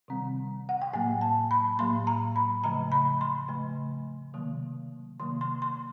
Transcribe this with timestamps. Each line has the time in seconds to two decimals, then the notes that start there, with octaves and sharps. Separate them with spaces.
0.08 C3 D#3 G3 C4
0.69 F#5
0.82 G5
0.93 A2 F#3 A#3 G#5
1.21 A5
1.51 B5
1.79 A2 F#3 A#3 C6
2.07 A#5
2.36 B5
2.64 C#3 F3 A3 A#5
2.92 B5
3.21 C6
3.49 C#3 F3 A3
4.34 C3 D#3 F#3 A#3
5.20 C3 D#3 F#3 A#3 C6
5.41 C6
5.62 C6